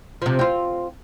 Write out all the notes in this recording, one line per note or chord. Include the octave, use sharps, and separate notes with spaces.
C3 F3
C4 F4